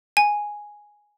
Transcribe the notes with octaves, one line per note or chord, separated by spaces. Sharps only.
G#5